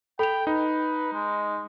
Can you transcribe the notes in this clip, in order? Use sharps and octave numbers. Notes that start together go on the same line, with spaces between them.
A4 G5 B5 F7
D#4 B4
G#3